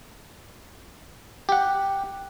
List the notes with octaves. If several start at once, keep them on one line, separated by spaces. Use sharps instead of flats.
G4 F#5